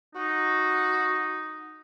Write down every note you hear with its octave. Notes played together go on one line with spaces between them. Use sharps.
D#4 F#4